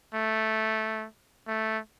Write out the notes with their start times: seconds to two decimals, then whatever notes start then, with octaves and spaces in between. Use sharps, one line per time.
0.14 A3
1.48 A3